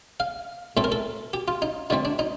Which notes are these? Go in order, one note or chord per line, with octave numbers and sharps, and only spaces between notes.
F5
A2 A3 C4 A4
A#4
A4
G4
F4
D#4
D3 A3 C4 D#4
D4
D#4